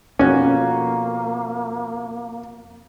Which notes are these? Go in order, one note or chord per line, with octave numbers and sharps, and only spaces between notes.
F2 B2 A#3 C#4 F#4